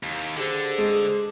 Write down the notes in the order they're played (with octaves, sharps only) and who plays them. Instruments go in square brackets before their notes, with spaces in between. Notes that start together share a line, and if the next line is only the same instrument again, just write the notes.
[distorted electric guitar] D#2
[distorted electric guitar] D3 [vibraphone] G4 G#4 C5
[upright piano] G#3